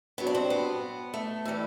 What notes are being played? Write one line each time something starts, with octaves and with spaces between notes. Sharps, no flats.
G2 F#3 B3
D4
C4
B3
A3
A2 E3 G3